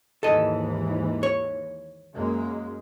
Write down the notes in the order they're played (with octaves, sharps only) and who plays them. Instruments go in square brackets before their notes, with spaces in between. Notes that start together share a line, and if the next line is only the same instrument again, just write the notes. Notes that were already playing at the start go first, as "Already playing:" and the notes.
[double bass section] D#2 G#2 E3 [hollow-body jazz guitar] A4 D#5
[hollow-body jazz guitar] C#5
[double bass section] F#2 G#3 A#3